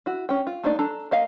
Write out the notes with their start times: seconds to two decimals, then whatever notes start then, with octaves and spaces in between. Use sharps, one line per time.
0.06 E4 F#4
0.29 C#4 G5
0.47 F4
0.64 A3 A#3 D4 D#4 D5
0.79 D4 A4 A#5
1.11 A#3 D#5 F5